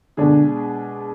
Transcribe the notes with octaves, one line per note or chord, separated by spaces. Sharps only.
B2 D3 G#3 D4 G#4